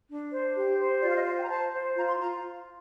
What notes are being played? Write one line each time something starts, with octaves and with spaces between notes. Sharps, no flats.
D4
C5
G4
C5
F4 D5
F5
D#5
C5 F5
G5
A#5
C5 A5
C5
F4 A#5
C6
F4 A#5